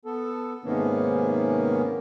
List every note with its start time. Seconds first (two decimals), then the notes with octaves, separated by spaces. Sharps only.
0.05 B3 A4
0.65 G#2 C3 D#3 A#3 B3 C#4